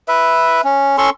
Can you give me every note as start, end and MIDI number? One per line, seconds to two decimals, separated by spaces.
0.08 0.61 71
0.08 0.61 76
0.64 0.97 61
0.98 1.10 61
0.98 1.10 69
0.98 1.10 84
0.98 1.10 85